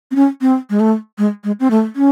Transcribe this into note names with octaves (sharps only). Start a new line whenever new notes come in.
C4
C#4
C4
G#3
A3
G#3
G#3
C4
A3
C#4